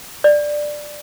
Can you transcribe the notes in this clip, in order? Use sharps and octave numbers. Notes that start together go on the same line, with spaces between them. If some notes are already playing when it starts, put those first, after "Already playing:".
D5